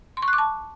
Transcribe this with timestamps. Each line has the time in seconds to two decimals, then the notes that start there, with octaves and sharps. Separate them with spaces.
0.17 C6
0.22 C#6
0.28 F#6
0.33 D6
0.38 A5